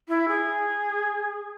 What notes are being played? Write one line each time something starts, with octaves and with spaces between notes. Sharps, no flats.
E4
G#4